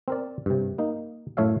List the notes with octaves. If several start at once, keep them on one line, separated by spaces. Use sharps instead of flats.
C4 A#4 D5
G2 C3
A#3 D#4
F#2 A2 A3 C#5 E5 F5